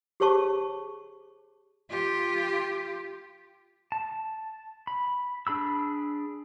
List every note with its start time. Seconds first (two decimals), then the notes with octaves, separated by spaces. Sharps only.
0.20 G4 G#4 C5 C#5 A5 C#6
1.90 F4 G4
3.92 A5
4.87 B5
5.47 D4 G#4 B5 E6